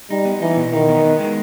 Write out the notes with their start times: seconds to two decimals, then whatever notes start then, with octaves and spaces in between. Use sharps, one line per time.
0.10 G3 D#4
0.25 B3
0.41 E3 D#4
0.57 B2
0.72 D#3 D#4
0.89 B3
1.05 B3
1.19 G#3